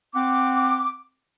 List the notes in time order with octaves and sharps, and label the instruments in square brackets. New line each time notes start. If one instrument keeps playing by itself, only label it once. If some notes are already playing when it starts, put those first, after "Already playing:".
[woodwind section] C4 F#5 D6